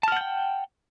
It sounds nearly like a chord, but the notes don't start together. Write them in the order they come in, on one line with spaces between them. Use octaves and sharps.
A5 F6 F#5 G6 G5